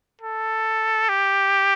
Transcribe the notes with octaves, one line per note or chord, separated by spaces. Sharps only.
A4
G4